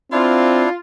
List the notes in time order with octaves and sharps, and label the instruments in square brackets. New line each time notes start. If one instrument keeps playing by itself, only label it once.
[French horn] C4 [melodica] D4 E4 [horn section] F4